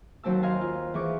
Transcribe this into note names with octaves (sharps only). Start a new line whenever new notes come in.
D#2 F#3 C4 A5 E6
D#5 F5 G#5 A#5 C6
F4
E3 C4 G#4 C#6 D6